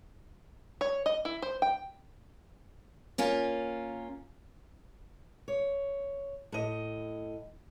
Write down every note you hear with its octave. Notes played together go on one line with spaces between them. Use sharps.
C#5
D#5
E4
C5
G5
A#3 C#4 F4 A#4
C#5
A2 D#5